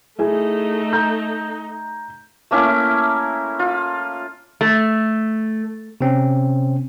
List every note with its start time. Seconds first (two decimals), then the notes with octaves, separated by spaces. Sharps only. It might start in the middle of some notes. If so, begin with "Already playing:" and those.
0.19 A3 D#4 E4 G#4 G#5
0.93 A#5 G6
2.51 A3 A#3 C#4 E4
3.59 F4
4.61 A3
6.01 C3 C4 C#4